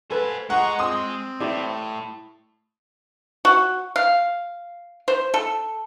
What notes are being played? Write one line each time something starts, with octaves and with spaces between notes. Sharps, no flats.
A4 B4 C5 G#5
G#3 D#5 F#5 A#5 C#6
C4 C6 D#6
A2 E4 G4 D5
F#4
F5
C5
A4